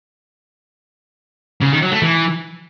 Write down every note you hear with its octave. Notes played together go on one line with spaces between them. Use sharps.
C#3
D#3
F#3
A3
E3